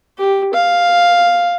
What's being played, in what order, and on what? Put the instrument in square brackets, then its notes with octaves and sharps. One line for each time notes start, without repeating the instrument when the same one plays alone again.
[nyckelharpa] G4
F5